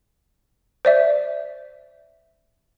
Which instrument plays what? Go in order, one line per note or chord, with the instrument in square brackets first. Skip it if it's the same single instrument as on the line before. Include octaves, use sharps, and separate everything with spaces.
[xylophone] C5 D5 E5